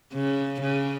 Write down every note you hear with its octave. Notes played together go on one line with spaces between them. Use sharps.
C#3
C#3